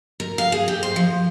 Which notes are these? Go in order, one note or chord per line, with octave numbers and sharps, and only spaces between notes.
A#4
F5
G#4
G4
C5
F3